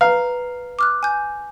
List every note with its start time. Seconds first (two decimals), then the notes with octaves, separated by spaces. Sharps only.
0.01 B4 F5 A#5
0.79 D6 F6 F#6
1.03 G#5 G6